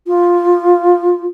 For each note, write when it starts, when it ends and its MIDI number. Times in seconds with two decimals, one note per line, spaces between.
0.07 1.24 65